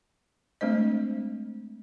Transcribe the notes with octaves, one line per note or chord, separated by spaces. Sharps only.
G#3 A3 C4 D4 C5 D#5